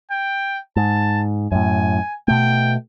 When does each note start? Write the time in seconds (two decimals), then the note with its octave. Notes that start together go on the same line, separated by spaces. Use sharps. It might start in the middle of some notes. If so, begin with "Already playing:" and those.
0.10 G5
0.76 G#2 A5
1.52 F#2 A2 G#5
2.28 B2 A3 G5